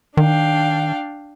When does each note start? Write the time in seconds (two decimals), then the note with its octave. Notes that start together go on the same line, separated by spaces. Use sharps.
0.17 D#3 D4 F5 G5